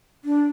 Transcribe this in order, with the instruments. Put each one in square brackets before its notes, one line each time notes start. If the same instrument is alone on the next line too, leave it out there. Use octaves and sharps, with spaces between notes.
[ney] D4